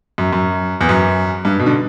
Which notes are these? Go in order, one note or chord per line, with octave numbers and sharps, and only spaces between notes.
F#2
F#2
E2
F#2
G2
B2
D3